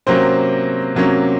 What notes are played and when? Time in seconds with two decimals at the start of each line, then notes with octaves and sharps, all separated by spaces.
0.07 C3 F#3 A#3 C4 C#4 C5
0.95 C3 F#3 A#3 C#4